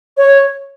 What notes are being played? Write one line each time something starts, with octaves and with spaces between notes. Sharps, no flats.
C#5